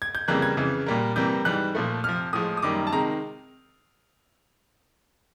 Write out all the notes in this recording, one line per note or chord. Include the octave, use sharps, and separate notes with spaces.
G#6
G6
F2 C#3 E3 G3 A#3 F#6
G#6
F2 C#3 E3
A#2 G3 A#3
C3 E3 G3 A#3 G6
G#2 E3 G3 F#6
A#2 F3 A3
F2 C3 F3 F6
A2 F3 G#3 D#6
D#6
F#2 D#3 G3 A#3 D6
A5
C3 D#3 G#3 A#5